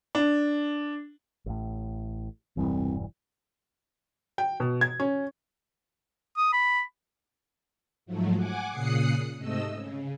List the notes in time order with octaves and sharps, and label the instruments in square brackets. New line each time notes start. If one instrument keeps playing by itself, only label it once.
[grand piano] D4
[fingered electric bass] A1 A2
[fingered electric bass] E1 G2 E3 [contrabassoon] C2
[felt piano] G5
B2
G#6
C#4
[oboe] D#6
B5
[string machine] G#2 F3 F#3 A3
F#5 G#5 D6
A#2 C#3 D#6 F#6 C7 C#7
G#2 C3 A3 D#5 E6
C#3